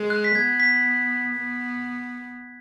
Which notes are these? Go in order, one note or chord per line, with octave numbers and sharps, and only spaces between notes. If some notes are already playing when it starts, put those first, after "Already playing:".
Already playing: G#3
F#6
B6
B3 G#6
B6
B3